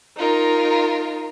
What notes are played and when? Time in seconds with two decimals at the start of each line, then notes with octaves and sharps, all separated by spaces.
0.17 D#4 F4 A#4